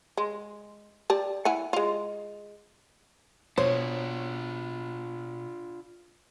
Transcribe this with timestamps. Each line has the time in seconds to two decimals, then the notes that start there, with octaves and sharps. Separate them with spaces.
0.17 G#3
1.10 G4 D5 A5
1.45 E4 F#5 G#5
1.73 G#3 F4
3.58 B2 D4 F4 C5 C#5